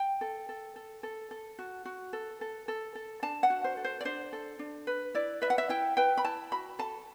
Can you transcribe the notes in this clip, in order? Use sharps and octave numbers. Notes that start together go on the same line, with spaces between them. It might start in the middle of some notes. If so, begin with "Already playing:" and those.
Already playing: G5
A4
A4
A4
A4
A4
F#4
F#4
A4
A4
A4
A4
D4 A5
F#5
F#4
C5
A4
C5
D5
D4 C5
A4
D4
B4
E4 D5
B4 E5
F#5
E5
E4 G5
B4 G5
B5
E4 A5
F#4 B5
A4 A5